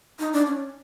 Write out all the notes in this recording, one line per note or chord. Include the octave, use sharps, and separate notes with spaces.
D#4
D4
C#4